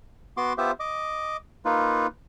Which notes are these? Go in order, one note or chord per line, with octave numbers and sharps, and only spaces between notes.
B3 F#4 C6 D6
B3 F4 G4 C5 E5
D#5 D6
A#3 D#4 F4 B4